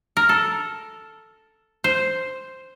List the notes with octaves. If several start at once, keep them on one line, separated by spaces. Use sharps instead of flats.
A#4
A4
C5